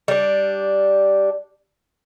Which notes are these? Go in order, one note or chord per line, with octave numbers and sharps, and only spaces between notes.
G3 D4